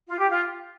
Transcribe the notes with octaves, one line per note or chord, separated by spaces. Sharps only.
F4
G4
F4